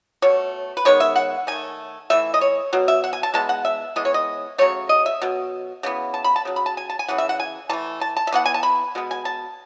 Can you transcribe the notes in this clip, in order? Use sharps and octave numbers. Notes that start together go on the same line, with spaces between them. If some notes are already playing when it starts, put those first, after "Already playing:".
B2 A3 C#5
B4
D#3 G#3 B3 C#5
E5
F#5
D#3 A3 G#5
E3 A3 E5
D#5
C#5
B2 F#3
E5
F#5
G#5
A5
E3 G#3 B3 A5
F#5
E5
E3 G#3 B3 D#5
C#5
D#5
C#3 F#3 A3 C#5
D#5
E5
B2 F#3
C#3 E3 B3
A5
B5
A5
C#3 F#3
B5
A5
G#5
A5
G#5
C#3 E3 F#5
E5
F#5
G#5
E3 A3 A5
A5
A5
E5
E3 B3 F#5
G#5
A5
B5
B2 G#3 B3
G#5
A5